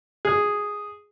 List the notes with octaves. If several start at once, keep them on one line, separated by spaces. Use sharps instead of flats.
G#4